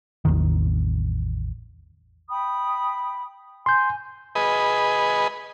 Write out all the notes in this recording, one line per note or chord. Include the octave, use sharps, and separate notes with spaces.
A1 E2 D#3
G5 B5 D#6
G#5 C6 G6
G#4 B4 D#5